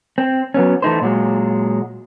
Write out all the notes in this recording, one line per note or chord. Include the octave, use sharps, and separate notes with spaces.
C4
F#3 B3 C#4
E3 A3 D#4 C5
A#2 F#3 G#3